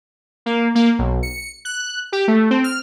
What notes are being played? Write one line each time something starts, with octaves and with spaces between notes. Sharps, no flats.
A#3
A#3
B1
C#7
F#6
G4
A3
C4
F6